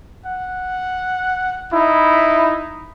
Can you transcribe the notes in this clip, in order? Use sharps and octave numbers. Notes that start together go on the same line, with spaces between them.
F#5
D#4 E4